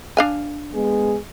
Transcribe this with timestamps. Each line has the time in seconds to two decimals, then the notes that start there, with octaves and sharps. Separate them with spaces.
0.17 D4 F5 G#5
0.74 G#3 B3 G#4